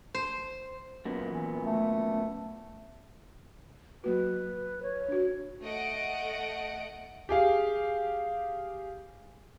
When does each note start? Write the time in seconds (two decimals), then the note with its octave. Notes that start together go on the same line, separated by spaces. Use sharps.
0.14 C5
1.05 F#2 A#2 B3
1.28 E3
1.65 A3
4.04 F#3 A#3 F#4 B4
4.83 C#5
5.08 D4 F#4
5.61 A3 D#5 F#5 D7
7.29 G4 G#4 F5